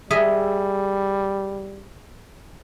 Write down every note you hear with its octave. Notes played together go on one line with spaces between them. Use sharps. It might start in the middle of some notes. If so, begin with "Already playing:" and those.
G3 G#4 D#5 E5